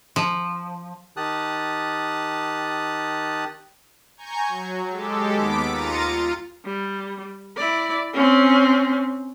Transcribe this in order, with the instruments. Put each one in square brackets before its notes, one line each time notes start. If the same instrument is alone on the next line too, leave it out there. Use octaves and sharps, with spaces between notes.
[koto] F3
[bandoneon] D#3 G4 A5 D#6 F#6
[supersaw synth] G#5 A#5 C#6 G6
F#3
G#3 G4 A4
D#2 B3 D6 B6 D7
D#2 F4 A#5 A6 C#7 D#7
F4
[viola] G3
E4 D5
C4 C#4